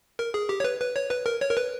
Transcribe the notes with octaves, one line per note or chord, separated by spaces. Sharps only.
A#4
G#4
G4
C#5
B4
B4
C#5
B4
A#4
C#5
A#4
B4